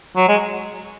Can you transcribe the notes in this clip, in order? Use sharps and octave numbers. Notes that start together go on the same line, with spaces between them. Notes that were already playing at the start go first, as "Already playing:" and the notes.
F#3
G#3